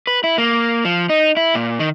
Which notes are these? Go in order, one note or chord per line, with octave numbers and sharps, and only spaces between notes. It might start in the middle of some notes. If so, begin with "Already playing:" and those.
B4
E4
A#3
F3
D#4
E4
A#2
D#3